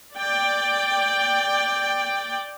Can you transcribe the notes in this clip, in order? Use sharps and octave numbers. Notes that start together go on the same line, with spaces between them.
D5 G5